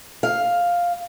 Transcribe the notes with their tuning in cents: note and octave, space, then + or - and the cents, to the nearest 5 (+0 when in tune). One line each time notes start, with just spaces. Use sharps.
F5 +5